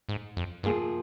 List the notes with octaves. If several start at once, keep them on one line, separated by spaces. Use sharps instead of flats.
G#2
F2
G2 C3 F3 A#3 F4 G#4